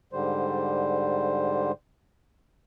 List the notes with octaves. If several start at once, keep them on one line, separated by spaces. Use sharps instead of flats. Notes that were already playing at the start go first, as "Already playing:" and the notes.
G#2 D3 G3 C5